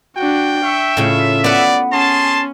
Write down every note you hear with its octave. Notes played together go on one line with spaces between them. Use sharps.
D4 F#4 G5
E5 C#6
A2 C#3 F4
B3 B4 D5
C#4 G#4 A5 C6